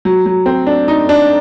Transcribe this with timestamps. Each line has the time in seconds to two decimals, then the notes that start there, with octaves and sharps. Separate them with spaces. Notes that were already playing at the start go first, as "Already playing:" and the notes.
0.05 F#3
0.26 F#3
0.46 C4
0.67 D4
0.88 D#4
1.09 D4